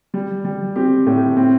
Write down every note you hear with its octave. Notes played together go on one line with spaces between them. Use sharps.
G3
G3
C4 G4
A2
C4